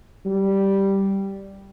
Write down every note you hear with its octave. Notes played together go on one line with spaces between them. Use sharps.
G3